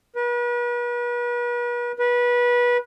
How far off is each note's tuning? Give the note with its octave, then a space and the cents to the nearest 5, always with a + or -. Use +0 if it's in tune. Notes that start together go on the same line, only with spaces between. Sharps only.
B4 -40
B4 -25